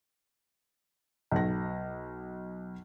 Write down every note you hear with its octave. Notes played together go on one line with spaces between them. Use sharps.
B1 A#6